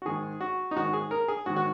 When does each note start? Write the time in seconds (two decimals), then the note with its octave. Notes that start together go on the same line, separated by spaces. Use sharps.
0.02 F#4
0.05 G#2 D#3 G#4
0.41 F#4
0.71 D#4
0.76 G#2 D#3 F#4
0.93 G#4
1.11 A#4
1.28 G#4
1.46 G#2 D#3 F#4
1.56 F#4